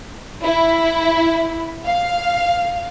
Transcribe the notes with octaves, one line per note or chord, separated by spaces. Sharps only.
E4
F5